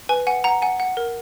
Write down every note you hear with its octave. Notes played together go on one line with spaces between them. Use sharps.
B4 G#5
F#5 G#5
F#5 A#5
F#5 G#5
F#5
A#4